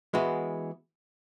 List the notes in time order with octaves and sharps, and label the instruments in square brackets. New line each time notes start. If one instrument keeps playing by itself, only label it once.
[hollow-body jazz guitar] E3 G#3 B3 F#4